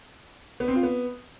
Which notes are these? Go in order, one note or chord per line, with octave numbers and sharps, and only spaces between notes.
B3
C4
F4
B3